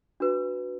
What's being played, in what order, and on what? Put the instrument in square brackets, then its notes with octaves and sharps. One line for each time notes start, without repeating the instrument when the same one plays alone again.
[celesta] D4 F#4 B4